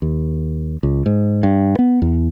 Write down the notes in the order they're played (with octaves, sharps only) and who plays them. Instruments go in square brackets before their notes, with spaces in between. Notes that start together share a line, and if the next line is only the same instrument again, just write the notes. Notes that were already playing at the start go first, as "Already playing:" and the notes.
[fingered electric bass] D#2
C#2
G#2
G2
B3
E2